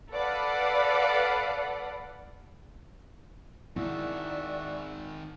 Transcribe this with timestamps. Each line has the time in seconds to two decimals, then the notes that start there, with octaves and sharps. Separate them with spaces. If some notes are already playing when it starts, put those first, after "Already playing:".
0.12 A4 B4 D5 F5 F#5 B5
3.76 G#2 D#3 E4 F#4 D5 E5